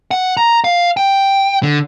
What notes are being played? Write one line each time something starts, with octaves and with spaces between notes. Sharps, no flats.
F#5
A#5
F5
G5
D3